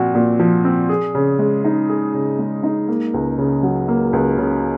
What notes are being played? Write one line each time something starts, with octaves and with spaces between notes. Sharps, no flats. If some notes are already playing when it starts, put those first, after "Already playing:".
Already playing: A#2 F3 C4 F#4
A#2
F3
C4
G#4
C#3
G#3
D#4
G#4
C#3
G#3
D#4
A#3
C#2
C#3
F#3
A#3
C#2
C#3